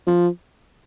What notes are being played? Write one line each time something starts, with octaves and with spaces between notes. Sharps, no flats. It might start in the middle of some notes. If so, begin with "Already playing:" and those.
F3